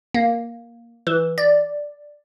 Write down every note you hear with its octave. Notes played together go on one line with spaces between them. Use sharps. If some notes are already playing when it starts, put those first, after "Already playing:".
A#3
E3
D5